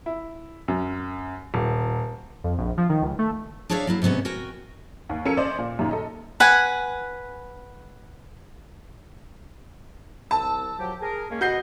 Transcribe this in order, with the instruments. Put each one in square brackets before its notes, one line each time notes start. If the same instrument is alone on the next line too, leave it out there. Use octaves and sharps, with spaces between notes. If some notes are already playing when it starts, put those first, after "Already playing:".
[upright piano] E4
F#2
D#1
[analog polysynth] F2
A#1
F3
D#3
C#2
A3
[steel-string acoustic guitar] D4 G#4 C#5 D5 E5 F5
F#3 A#3 E4
G#2 C3 F#3 B3 C#4
F#4 A#4 G5 G#5
[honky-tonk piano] D#2
F3 C#4 A4 A#4 E6 C#7
C#4 C5 D5 D#5
A#2
F#2 A#2 D#3
A4 D#5
[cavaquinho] B4 F#5 G#5
[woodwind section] C2 E6 [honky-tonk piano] A5
[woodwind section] F3 F#3 G4
G#4 A#4
G#3 A#3 C#4
[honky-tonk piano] F#4 G6 C7 [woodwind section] B4 D#5